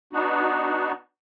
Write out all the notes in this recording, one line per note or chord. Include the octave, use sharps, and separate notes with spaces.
B3 D4 D#4 F#4